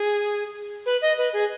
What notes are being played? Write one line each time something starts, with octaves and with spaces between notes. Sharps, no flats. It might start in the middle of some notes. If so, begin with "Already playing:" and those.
Already playing: G#4
B4
D#5
B4
G#4